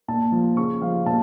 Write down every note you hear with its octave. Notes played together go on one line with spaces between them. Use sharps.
A#2 A5
F3
C#3 C#6
F3 F5
A#2 A5